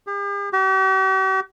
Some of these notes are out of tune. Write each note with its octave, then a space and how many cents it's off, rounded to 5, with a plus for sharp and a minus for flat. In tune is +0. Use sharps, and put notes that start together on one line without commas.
G4 +45
G4 -45